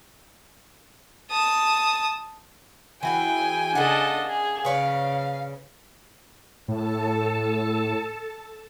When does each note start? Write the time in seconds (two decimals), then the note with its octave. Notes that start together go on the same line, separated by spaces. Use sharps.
1.31 A5 D#6
3.03 E3 F#4 G#4 G5 G#5
3.75 C#3 D4 A4 D#5 F#5
4.28 G#4
4.65 C#3 B4 C#5 D5 F5
6.68 A2 A4 A5